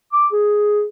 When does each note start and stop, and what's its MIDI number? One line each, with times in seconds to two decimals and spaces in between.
0.13 0.27 86
0.32 0.84 68